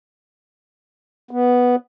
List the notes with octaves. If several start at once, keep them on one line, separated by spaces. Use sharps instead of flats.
B3